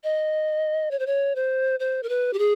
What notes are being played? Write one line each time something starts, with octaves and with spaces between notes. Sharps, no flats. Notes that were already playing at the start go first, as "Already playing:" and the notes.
D#5
C#5
C5
C#5
C5
C5
A#4
B4
G4
G#4